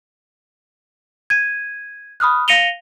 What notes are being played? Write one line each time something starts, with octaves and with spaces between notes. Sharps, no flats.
G#6 D#7
B5 D#6 F6 F#6
F5 A#6 C#7 D#7 F7 G7